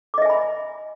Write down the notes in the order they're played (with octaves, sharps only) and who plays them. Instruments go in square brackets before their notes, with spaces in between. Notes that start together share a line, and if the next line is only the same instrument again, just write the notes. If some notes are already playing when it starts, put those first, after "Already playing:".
[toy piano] D6
D#5
E5
G#5
B5